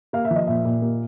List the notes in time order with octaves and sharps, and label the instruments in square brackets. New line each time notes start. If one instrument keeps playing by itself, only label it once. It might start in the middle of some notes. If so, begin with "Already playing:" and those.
[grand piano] A#3 F5
E5
F3
D#5
A#2 E5
A#2
A#3